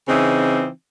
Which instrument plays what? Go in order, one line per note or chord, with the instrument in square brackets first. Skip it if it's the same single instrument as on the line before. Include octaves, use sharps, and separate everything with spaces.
[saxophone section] C#3 E3 C4 D#4